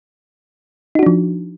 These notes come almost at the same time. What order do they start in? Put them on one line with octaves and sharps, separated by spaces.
D#4 F#4 D4 F3